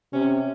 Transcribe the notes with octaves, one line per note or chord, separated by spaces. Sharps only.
C3 C#4